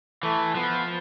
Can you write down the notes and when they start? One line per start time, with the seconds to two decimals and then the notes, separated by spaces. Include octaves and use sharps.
0.23 E3 A3
0.55 F3 B3